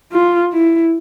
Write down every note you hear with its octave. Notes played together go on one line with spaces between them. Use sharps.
F4
E4